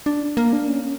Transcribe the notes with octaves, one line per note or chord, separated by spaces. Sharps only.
D4
A#3
D4
C#4